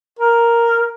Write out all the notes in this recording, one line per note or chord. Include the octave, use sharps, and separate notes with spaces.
A#4